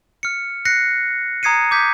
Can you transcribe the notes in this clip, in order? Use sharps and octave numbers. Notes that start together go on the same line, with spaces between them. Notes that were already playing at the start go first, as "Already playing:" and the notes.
F6 C#7
F#6 A#6 C7 C#7
A#5 D#6 G#6 C7 C#7 D#7
D6 G6 B6